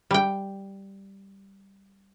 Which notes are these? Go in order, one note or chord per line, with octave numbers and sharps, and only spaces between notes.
G3 G5